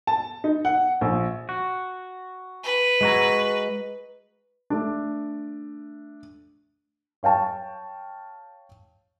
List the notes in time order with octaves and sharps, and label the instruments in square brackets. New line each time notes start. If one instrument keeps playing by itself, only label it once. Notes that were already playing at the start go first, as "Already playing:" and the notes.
[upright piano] A5
D#4
F#5
A#1
[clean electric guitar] F#4
[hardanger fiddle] B4
[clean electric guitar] G#3 F#4 A#5
[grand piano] A3 D4
[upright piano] C#5 F5 G5 A5 C#6